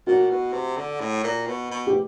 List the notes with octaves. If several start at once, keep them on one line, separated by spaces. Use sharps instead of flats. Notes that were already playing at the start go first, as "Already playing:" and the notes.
A#2 F#4
B2
C3
D3
A2
A#2
B2
B2
G4